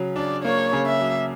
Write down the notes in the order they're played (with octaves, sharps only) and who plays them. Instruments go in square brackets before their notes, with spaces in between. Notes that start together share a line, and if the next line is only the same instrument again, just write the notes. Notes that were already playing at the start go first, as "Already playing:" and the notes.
Already playing: [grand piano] C#3 F#3
[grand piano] D4 [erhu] D5
[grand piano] A#3 [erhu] C#5
[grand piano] C#3
[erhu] E5
[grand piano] F#3